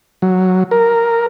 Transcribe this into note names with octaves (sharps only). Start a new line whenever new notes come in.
F#3
A#4